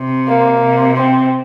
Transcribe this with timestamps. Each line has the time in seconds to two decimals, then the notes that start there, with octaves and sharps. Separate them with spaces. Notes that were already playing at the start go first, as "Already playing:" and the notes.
Already playing: C3
0.28 A#3
0.62 C3
0.97 C4